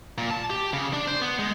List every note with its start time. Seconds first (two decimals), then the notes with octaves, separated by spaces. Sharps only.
0.18 A#2
0.31 A5
0.50 G4
0.73 C#3
0.93 D4
1.07 C5
1.22 B3
1.39 G#3